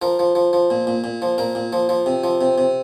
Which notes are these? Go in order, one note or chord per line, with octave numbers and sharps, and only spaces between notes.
F3 A#4
F3
F3
F3
A#2
A#2
A#2
F3
A#2 A#4
A#2
F3
F3
C3
F3
C3
C3